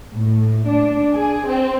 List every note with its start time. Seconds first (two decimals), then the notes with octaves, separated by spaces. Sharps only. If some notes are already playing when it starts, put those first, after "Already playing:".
0.13 A2
0.67 D4
1.14 G#4
1.46 C4